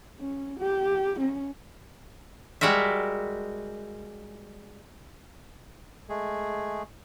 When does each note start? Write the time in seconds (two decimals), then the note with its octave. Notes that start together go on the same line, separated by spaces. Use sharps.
0.19 C#4
0.59 G4
1.19 C#4
2.61 G3 G#3 F#4 A#4 E5
6.09 G#3 A3 G#4